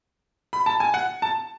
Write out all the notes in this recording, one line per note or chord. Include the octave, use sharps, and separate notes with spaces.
B5
A5
G#5
F#5
A5